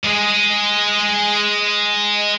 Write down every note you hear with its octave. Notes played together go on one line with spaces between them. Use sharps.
G#3 G#4